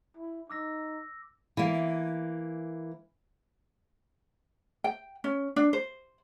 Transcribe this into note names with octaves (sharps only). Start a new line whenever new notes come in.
E4
D#4 D6 E6 A#6
E3 A#3
G5
C#4
D4
C5